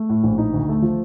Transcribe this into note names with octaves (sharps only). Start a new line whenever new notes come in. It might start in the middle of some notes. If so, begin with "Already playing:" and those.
Already playing: A3
A2
A#1
D#4
D2
A3
F3